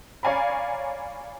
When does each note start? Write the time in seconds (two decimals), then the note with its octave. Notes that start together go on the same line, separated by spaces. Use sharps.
0.23 C#5 D5 F5 G#5 A#5 B5